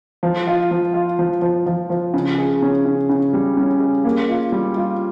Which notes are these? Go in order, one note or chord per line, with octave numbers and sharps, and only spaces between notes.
F3
F4
F3
F4
F3
F3
F3
F3
C#3
G#4
C#4
C#3
C#3
G3
C#4
G#4
A#3
F4
G3
F4